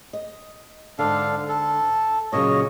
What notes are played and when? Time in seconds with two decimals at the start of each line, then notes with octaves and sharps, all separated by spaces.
0.13 D#5
0.99 G#2 D3 D4 A4 F5
1.49 A4
2.33 A#2 C#3 F#3 C#5 D#5